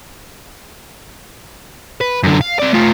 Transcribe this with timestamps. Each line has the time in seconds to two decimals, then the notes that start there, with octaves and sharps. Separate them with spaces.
2.01 B4
2.23 F#2 D3
2.41 F5
2.59 C4 D5
2.73 A3 F4